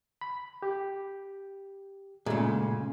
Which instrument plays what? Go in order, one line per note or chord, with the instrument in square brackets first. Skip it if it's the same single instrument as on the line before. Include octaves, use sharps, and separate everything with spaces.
[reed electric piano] B5
G4
[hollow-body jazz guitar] A#2 C#3 [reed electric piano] G#3 A3